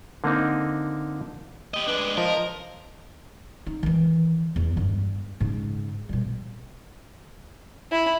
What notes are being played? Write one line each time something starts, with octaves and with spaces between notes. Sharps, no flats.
D3 A#3 C4 D#4
G4 D#5
G#3 D4 B4
F3 A#4 D#5
D#4
D#3 E3
E2
G2 B3
G#2 C#3
B2 G3
E4